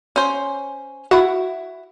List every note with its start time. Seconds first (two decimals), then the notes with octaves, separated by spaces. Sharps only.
0.16 C#4 C5
1.11 E4 F#4 F#5